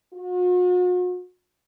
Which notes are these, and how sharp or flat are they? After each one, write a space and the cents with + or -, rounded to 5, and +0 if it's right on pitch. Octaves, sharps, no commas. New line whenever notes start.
F#4 -45